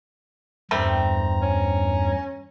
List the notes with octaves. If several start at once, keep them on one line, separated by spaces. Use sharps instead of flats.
E2 G2 G3 A3 C4 A#5
C#4